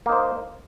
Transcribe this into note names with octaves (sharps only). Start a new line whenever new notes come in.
A#3 D#4 C5